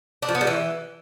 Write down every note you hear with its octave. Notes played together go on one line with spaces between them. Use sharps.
D4
F3
B3
G3
E3